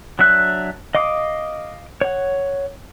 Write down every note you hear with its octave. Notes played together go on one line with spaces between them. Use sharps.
F#3 D4 E5 F#6
D#5 F5 D6 D#6
C#5 F#5